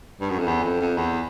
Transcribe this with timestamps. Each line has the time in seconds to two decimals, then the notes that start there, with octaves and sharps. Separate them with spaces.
0.21 G2
0.30 F#2
0.39 F2
0.47 E2
0.63 F2
0.81 F2
0.98 E2